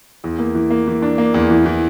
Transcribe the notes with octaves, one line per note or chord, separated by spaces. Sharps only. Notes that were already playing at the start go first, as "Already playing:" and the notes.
E2
A#3
E3
A#3
E3
D4
A#3
E2
E3
E3